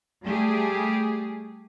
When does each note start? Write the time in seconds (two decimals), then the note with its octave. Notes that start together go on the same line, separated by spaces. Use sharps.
0.23 G3 A3 G4 G#4